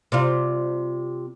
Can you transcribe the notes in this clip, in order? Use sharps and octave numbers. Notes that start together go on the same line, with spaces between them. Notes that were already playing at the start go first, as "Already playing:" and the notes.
C3 G3 F4